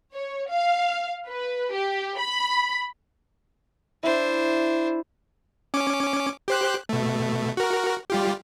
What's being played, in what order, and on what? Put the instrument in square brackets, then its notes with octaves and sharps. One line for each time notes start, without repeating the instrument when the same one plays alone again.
[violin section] C#5
F5
B4
G4
B5
[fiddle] D4 C5 [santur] E4
[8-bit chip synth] C#4 D6
G4 C5 F#6
B2 A3
F#4 A#4
G3 F4 G4